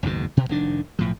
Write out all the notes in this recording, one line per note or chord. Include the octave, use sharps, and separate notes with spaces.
F#1 D#2 G#2 B2
B2
F1 D#3 D4
B1 A2 F3